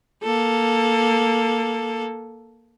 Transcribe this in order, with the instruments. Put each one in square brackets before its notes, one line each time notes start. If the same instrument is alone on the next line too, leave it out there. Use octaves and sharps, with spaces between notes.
[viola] A#3 A4